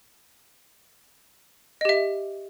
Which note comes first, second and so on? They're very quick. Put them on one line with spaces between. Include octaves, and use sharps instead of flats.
D#5 G4 E5